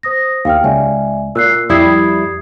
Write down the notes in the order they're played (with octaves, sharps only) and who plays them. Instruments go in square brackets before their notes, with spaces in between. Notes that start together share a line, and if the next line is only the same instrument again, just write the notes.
[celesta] C5 D#6 A#6
[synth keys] D#2 [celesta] F5 G5 F6
[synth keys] C#2 [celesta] D5 E5 G#5
[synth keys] A#2 [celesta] E6 F#6 C7
[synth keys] F2 G3 E4 [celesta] D#6 G#6 C7